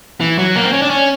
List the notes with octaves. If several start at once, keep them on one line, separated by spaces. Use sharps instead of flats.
E3
F#3
A#3
C4
C#4
D4
C#4